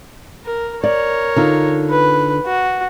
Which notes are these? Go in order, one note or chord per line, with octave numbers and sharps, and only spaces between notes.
A#4
A#4 C#5 D5
D3 D#4 F4
B4
F#4